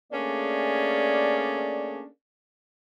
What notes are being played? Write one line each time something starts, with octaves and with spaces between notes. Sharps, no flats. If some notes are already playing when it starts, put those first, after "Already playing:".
A3 A#3 C#4 D4 G#4 D5